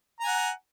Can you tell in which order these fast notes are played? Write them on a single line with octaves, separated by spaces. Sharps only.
A#5 G#5 F#5